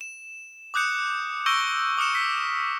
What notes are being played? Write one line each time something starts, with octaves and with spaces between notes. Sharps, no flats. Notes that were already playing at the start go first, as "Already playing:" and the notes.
E7
D6 D#6 F#6 G6 C#7
C#6 E6 G6 A#6 D7 G7
D6 D#6 F6 C#7 E7
B6